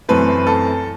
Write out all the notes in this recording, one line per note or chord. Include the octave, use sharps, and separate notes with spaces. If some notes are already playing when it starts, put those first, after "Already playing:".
F#2 E3 A3 C4 B4
A4